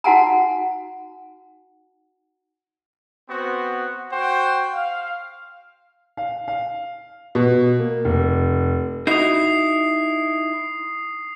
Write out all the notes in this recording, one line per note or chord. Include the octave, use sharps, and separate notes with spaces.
D#4 F#4 F#5 G#5 A#5
B3 C4 F#4 C5
F#4 C5 G5
F5
F5
F5
B2
A#3
F1
D#4 E4 F#4 D#6 C7